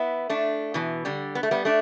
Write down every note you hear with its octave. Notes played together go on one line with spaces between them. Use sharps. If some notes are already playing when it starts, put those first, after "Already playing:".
Already playing: B3 E4
A3 D4
B2 E3
D3 G3
B3
A3
G3 B3
A3 D4